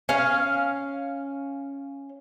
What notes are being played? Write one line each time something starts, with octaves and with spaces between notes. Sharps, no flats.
C#4 F5